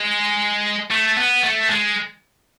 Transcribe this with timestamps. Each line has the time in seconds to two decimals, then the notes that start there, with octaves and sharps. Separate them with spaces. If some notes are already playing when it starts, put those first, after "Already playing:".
Already playing: G#3
0.91 A3
1.17 B3
1.44 A3
1.70 G#3